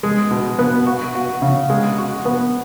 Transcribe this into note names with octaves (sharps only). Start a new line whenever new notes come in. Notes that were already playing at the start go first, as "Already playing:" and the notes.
G#3
B2
B3
F#4
F#4
C#3
G#3
F#4
B3